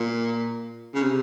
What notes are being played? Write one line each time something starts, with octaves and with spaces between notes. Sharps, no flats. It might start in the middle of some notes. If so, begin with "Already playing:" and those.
Already playing: A#2
C#3
C3